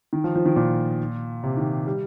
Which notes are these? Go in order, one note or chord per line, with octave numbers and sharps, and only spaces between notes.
D#3
F3
F3
D#3
A#2
C3
D#3
G3